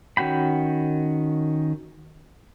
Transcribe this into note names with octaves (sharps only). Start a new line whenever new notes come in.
D#3 C#4 F#4 G5 B5